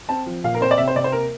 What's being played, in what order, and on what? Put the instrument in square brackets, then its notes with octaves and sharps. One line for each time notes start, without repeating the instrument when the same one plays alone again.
[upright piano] C4 A5
F3
A#2 F5
A#4
C4 C5
D5
C3 E5
C5
C3 D5
C5
A#3 A#4